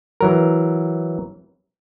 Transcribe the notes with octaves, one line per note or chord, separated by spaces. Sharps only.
E3 F#3 A#4